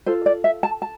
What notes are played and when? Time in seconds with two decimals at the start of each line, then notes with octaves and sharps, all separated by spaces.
0.06 F4 A4 C5
0.26 D5
0.44 E5
0.63 A5
0.82 A5